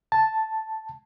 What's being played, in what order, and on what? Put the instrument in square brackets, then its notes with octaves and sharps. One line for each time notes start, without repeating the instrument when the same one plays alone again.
[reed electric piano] A5